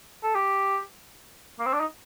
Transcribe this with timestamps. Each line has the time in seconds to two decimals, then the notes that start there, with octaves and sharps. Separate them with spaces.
0.23 A4
0.35 G4
1.59 A#3
1.66 C4
1.73 D4
1.80 D#4